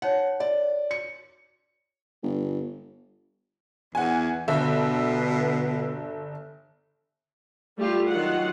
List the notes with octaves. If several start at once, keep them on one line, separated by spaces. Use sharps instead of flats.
D#4 C5 C#5 F#5
D5
C#7
G1
E2 F#5 G#5
G1 B2 E5
G3 A3 F4 G4
D#3 F#3 F4 F#5